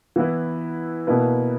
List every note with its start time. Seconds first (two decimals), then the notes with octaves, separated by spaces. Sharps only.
0.16 E3 B3 E4 B4
1.07 B2 A#3 E4 B4